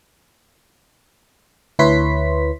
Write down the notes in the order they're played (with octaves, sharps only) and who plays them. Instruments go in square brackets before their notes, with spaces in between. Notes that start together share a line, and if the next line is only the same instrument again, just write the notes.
[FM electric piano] D2 E4 B4 C#5 C6 B6